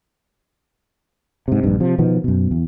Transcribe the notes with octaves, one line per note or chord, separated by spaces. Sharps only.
G#2 C3
A#1 G2
C3 F3
B2 D#3 F3 B3
F#2 B2
E2